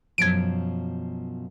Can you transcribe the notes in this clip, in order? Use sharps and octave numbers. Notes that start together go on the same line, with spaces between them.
F#2 B2 F3 G#6 D7